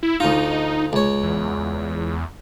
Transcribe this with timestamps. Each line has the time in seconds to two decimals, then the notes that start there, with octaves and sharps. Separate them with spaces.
0.03 E4
0.20 D2 D#4 F4
0.93 C#2 C#5
1.23 E2